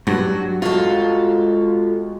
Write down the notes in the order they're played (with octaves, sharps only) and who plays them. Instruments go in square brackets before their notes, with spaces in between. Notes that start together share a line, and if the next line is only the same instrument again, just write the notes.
[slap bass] G2 [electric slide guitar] F#3 [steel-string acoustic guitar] F#4
[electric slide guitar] G#3 F#4 [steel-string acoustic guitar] F4 A4